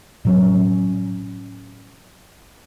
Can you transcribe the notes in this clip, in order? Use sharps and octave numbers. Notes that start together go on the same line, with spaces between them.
A2 F#3 C#4